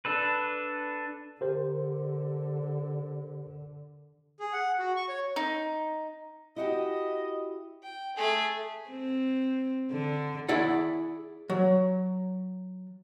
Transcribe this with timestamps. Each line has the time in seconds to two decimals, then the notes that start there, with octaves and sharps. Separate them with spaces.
0.05 D4 A4 B4
1.41 D3 G4 A#4 C5
4.40 G#4
4.53 F#5
4.79 F#4
4.96 C#6
5.09 C#5
5.36 D#4
6.56 E4 F#4 G4 D#5
7.83 G5
8.16 A3 G#4
8.90 C4
9.92 D3
10.48 E4 G#4 D5 F#5
11.49 F#3